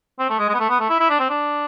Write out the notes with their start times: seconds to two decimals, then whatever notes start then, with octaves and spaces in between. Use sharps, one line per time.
0.19 C4
0.30 A3
0.39 G#3
0.49 G#3
0.54 B3
0.60 A3
0.69 B3
0.80 A3
0.90 E4
1.00 E4
1.10 D4
1.20 C4
1.30 D4